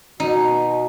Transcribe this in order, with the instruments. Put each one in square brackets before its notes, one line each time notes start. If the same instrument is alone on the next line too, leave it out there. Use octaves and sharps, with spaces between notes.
[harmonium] B2 [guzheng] D#4